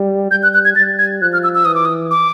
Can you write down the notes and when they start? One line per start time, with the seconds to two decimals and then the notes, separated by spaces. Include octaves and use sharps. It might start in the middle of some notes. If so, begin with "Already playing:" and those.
Already playing: G3
0.31 G3 G6
0.43 F#6
0.54 F#6
0.65 G#6
0.76 G3 A6
0.98 G#6
1.21 F3 F#6
1.33 F6
1.43 E6
1.55 E6
1.65 E3 D#6
1.75 D6
1.85 D#6
2.11 D6